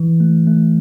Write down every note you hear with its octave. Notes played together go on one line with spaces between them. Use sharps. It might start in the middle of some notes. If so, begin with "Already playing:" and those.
Already playing: E3
A3
A3